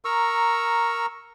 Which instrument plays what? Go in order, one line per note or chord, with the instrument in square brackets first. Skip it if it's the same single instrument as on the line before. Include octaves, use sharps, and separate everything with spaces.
[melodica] A#4 A#5 C#6 E6